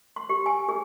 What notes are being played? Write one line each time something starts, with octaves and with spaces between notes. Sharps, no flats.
C6
G4
G#5
G#4